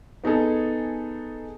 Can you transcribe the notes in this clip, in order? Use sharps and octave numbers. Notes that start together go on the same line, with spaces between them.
B3 D#4 G#4 A4